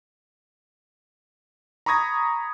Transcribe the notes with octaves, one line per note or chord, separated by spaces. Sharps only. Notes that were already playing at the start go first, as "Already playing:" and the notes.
A#5 B5 C#6 D#6 G#6 A#6